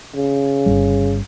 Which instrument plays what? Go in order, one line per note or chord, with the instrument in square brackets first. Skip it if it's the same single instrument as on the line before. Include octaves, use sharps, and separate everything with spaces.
[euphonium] C#3
[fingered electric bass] G1 C2 G3